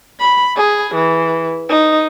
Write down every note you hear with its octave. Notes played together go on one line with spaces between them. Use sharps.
B5
G#4
E3
D#4